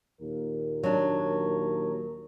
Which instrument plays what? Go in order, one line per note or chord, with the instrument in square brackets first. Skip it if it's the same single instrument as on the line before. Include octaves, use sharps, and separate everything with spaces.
[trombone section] D#2 A#2 A#4
[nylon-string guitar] F#3 D4